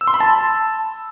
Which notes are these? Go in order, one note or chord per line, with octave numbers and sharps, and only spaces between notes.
E6
C6
B5
A5